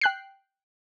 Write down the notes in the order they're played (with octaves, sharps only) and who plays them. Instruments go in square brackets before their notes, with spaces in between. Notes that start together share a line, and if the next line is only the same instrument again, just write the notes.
[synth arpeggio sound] G5 F#6 C7